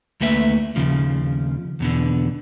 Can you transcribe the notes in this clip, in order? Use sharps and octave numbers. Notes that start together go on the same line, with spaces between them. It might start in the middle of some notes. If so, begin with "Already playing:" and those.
D2 A3 A#3 B4 E5
D#2 C#3 F3
E2 B2 D3